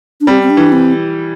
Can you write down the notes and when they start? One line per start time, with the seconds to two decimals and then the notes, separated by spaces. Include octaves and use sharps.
0.21 D4
0.27 G3 C4
0.43 C4
0.50 D4
0.57 E3
0.72 C4